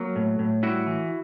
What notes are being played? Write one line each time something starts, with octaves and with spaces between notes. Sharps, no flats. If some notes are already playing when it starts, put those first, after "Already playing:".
Already playing: F#3 A#3
A2
A2
G3 E4 F#4
E3